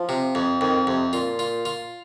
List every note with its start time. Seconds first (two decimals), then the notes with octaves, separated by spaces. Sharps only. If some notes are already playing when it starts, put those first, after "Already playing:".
Already playing: F3
0.09 C3
0.35 F2
0.61 F2 D#3
0.87 F2 C3
1.13 A#2 F4
1.39 F4
1.65 F4